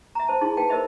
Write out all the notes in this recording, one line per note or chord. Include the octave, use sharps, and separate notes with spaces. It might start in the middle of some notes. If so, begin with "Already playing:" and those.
E5 A#5
C5 A5
D#4 E4 G#4 C6
B4 F5 G5 A5
A#4 C5 D#5 E5 B5